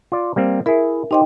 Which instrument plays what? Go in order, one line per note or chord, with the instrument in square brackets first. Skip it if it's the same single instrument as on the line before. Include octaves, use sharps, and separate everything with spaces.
[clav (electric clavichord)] F4 D5
G3 A#3 C4
[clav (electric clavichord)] E4 G#4 [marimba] A#4 E5
[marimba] D#4 D#5 G5 [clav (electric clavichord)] G4 C5